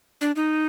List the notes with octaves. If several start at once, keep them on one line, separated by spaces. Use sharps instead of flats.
D4
D#4